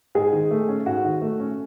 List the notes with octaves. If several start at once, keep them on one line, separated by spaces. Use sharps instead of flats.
G#2 G#3 G#4
D#3
A3
C#4
G#2 F#4
D#3
A3
C#4